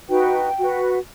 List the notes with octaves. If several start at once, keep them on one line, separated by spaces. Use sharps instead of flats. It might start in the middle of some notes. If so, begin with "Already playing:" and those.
D#4 F#4 B4 G5
F#4
B4